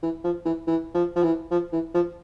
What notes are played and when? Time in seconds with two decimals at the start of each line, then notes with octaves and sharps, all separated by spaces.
0.03 E3
0.24 F3
0.46 E3
0.67 E3
0.95 F3
1.16 F3
1.24 E3
1.51 F3
1.72 E3
1.94 F3